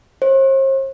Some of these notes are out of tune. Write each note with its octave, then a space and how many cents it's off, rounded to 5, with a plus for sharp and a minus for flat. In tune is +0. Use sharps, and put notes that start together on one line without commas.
C5 +45